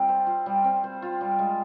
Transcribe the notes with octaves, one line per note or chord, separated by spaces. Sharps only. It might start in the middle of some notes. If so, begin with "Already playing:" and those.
Already playing: G3 C4 F4
C5
F4
G3
C4
C5
F4
G3
G#3